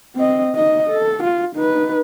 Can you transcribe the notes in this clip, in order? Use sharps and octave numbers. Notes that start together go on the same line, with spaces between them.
C4 D#5
D#4 D#5
A4
F4
D#4 B4